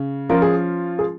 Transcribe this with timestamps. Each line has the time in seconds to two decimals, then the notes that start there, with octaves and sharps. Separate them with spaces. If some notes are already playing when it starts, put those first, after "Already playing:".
Already playing: C#3
0.29 F3 C#4 F4 A#4
0.42 G#4
0.99 G#4